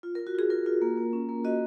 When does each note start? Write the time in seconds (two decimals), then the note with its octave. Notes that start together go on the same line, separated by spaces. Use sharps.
0.03 F4
0.15 A#4
0.19 F4
0.27 F#4
0.35 F4 G#4
0.50 F4 A#4
0.66 F4
0.82 A#3
0.97 A#3
1.13 C#4
1.29 A#3
1.44 F#4 D#5